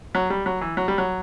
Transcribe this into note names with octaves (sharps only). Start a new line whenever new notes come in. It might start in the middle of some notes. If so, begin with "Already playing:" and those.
F#3
G3
F#3
E3
F#3
G3
F#3